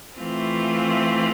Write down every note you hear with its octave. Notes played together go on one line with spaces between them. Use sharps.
E3 A3 C4 F4